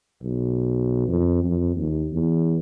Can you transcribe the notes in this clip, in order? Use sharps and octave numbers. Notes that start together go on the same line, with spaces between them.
B1
F2
F2
D#2
E2